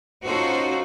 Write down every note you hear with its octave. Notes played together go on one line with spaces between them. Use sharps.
C#4 D#4 F4 F#4 A4 C5